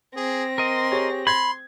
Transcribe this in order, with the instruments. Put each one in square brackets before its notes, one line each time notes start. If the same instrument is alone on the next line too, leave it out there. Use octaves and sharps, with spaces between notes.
[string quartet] C4 A#6 [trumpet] G#4
[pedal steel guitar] A#4 D#5 [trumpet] C6
[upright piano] G4 G#4 C#5
[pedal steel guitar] B5 [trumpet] C6 [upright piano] G#6